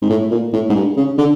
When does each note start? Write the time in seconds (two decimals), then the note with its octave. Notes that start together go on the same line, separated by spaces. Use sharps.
0.02 G#2
0.10 A2
0.31 A#2
0.53 A2
0.69 G#2
0.75 G2
0.97 C#3
1.18 D3